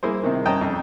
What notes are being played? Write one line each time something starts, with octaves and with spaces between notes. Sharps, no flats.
A#3 E4 G#4 C5
C3 D#3
C#4 D#5 G5 A5 A#5
F2